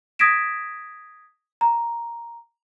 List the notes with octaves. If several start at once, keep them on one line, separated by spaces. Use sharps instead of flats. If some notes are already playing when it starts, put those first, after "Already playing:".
D#6 G#6 A#6 B6 D7 E7
A#5